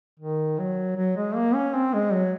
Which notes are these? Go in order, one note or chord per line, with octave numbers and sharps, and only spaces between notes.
D#3
F#3
F#3
G#3
A#3
C#4
C4
G#3
F#3